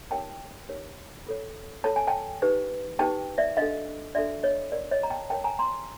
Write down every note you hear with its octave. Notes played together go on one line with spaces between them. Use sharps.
D#4 G4 A#4 C#5 G5 A5
D#4 G4 A#4 C#5
F4 A4 C#5
F4 A4 C#5 A5
G#5
G5 A5
D#4 G4 B4
D#4 G4 B4 G5 A5
D5 E5
D4 F#4 A4 D#5 F5
D4 F#4 A4 D5 E5
C#5 D#5
F4 A#4 C#5 D5
C#5 D#5
A#5
G5 A5
F4 A#4 C#5 G5 A5
G#5 A#5
A#5 C6